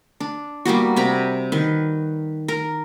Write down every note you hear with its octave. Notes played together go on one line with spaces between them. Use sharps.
D4
G3 A#3 B3 F#4
C3 A#5 B5
D#3 B4
A#4